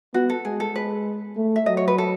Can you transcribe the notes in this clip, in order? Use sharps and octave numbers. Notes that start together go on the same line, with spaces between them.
B3 F#4
A4
G#3 G#4
A4
G#3 B4
A3
E5
F#3 D#5
C#5
B4
A4